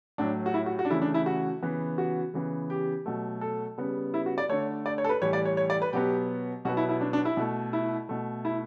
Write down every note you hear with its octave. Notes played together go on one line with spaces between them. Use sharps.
A2 F#3 A3 D4
F#4
E4
F#4
F#4
D4
C#3 E3 A3 E4
D4
E4
F#4
C#3 E3 B3
F#4
C#3 E3 B3
G4
B2 F#3 A3
A4
C#3 G3 B3
E4
F#4
D5
D3 A3 C#5
D5
C#5
A4
B4
A2 E3 G3 C#5
D5
C#5
C#5
D5
B4
B2 F#3 B3 G4
B2 F#3 B3 F#4
E4
E4
D4
D4
E4
B2 A3
E4
B2 A3
E4